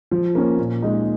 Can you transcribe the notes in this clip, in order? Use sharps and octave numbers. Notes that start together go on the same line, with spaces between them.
F3
A#3 C#4
A#2
G#3 D#4